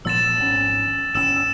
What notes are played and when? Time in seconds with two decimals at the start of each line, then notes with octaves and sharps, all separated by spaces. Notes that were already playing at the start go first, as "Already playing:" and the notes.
0.05 A#2 F3 B3 E6 A6 E7
0.38 G#1 C#4
1.15 G1 C4 C#4 E6 E7